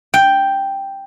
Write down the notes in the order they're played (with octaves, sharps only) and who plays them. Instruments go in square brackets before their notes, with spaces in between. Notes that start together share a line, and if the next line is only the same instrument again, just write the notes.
[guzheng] G5